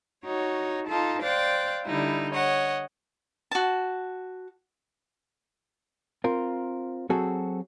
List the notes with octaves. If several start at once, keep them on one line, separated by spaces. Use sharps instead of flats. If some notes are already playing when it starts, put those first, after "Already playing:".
D#4 F#4 C#5
D#4 F4 A4 A5
C5 D5 F5 G5 F#6 A6
D3 G3 D#4 E4
C#5 D#5 F#5
F#4 A5
C4 F4 A#4
F#3 C4 F#4 G#4 A4